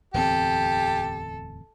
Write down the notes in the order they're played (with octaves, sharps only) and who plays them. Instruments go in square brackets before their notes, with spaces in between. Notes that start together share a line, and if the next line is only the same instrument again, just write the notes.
[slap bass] D1 E2 C4 [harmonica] G4 [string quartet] A4